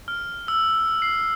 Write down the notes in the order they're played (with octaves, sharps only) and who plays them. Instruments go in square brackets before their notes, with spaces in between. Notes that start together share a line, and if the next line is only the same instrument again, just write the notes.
[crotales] F6
E6
C7